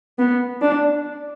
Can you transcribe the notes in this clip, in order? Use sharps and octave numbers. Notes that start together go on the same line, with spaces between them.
B3
D4